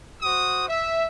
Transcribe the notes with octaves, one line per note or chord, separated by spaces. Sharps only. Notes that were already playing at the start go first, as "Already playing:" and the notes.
F#4 C5 D#6
E5